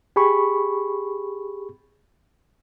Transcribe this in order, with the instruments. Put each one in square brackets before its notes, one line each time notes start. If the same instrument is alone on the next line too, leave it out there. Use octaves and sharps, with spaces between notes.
[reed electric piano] G4 G#4 B5 C#6